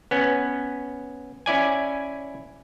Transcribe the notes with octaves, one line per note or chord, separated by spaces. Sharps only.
B3 C#4
C#4 E4 D5 G#5